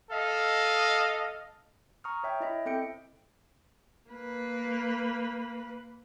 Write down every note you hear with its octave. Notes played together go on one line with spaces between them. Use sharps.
A4 D#5 F5
A#5 C#6 D#6 F6
C#5 E5 G5
E4 D#5 E5
C4 A4 G5 G6 C#7 D7
A#3 B4